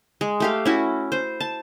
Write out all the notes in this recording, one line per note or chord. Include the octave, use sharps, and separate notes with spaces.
G#3
A3 G4 F5
C#4 E4 F#4
C5
A5